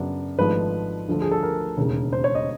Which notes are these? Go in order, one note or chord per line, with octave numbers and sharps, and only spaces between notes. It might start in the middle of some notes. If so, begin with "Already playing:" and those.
Already playing: F#2 C#3 F#3 B3 D4
G#1 G#2 F3 A3 D4 B4
D2 D3 F3 A3
G#4
A4
A#4
E1 D#2 C#3
C5
C#5
D#5